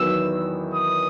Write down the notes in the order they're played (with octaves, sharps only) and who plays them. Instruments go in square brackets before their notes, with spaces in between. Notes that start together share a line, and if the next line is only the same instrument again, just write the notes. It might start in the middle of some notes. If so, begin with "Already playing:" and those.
Already playing: [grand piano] E2 D#3 F#3 B3 [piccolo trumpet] E6
[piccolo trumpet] D#6